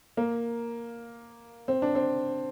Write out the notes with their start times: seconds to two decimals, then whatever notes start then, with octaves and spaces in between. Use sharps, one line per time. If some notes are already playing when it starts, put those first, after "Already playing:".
0.17 A#3
1.68 C4
1.82 D4
1.95 C4